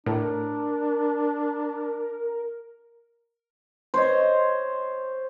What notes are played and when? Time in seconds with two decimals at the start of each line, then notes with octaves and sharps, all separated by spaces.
0.06 A2 D4 A#4
3.94 C5 C#5 D#5